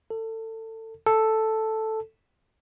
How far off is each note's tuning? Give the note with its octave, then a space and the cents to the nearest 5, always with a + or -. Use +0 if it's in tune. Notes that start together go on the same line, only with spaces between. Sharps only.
A4 +25
A4 +0